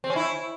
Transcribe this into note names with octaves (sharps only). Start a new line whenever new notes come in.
C4
C#4
E4